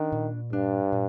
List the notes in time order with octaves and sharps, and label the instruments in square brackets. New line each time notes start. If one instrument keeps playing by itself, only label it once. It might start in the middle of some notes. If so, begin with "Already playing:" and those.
Already playing: [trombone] D#3 [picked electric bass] D4
[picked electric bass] A#2
[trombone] G2 [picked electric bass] D4
[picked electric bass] A#2